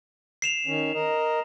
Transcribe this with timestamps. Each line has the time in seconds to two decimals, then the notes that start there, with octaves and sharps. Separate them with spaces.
0.42 C7 E7 F7
0.67 D#3 C#4
0.94 A#4 D#5